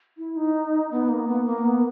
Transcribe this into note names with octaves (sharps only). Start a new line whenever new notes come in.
E4
D#4
B3
A#3
B3
A#3
B3